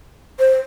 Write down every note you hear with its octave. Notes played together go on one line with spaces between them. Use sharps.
C5